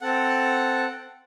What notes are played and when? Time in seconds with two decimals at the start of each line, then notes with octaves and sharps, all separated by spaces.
0.01 C4 A4 F#5